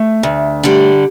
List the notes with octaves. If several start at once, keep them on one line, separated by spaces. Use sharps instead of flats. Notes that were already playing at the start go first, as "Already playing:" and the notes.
Already playing: A3
D2
D3 G3